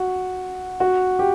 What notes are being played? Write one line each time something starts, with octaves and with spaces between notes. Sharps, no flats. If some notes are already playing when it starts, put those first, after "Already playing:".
Already playing: F#4
F#4
G4